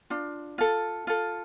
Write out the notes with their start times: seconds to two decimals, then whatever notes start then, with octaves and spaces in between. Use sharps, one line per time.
0.10 D4 F4
0.58 F4 A4
1.07 F4 A4